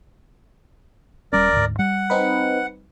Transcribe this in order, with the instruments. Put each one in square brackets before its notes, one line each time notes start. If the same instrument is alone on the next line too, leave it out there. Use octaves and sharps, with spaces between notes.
[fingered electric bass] D#1 G3 C#4 [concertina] A#4 D5
[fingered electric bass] D2 G#2
[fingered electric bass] G3 [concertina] F#5
[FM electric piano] C4 D#4 B4